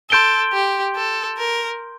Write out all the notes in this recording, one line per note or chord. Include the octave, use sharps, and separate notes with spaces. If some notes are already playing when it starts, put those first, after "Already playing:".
A4 C6 G6 D7 G7
G4
A4
A#4